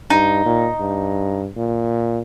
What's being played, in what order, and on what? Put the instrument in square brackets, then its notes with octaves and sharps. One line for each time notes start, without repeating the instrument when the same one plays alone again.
[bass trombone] G2 [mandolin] D#4
[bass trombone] A#2
G2
A#2